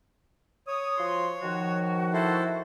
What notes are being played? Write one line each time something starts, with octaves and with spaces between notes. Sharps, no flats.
C#5 D#6
F3 F#4 C6
D#3 F3 F#4
E4 A4 C5